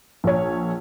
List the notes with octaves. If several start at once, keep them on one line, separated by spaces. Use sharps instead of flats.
A#1 C#5